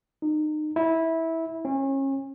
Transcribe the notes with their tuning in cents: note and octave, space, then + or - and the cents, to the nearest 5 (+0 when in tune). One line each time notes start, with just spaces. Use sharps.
D#4 -30
E4 -15
C#4 -30